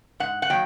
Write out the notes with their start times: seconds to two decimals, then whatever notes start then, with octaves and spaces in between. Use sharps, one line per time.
0.20 G#2 F#5
0.42 F#5
0.50 D#3 F#3 A#3 G5